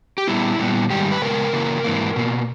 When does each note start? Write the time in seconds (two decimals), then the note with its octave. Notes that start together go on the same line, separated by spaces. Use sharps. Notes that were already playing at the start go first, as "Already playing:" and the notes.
0.18 G4
0.27 A#2 G3 B3 E4
0.59 A#2 G3 B3
0.90 G#2 D#3 G3 G4
1.12 B4
1.22 C#3 G#3 B3 A#4
1.53 C#3 E3 A#3
1.84 G#2 E3 A#3
2.16 B2 A#3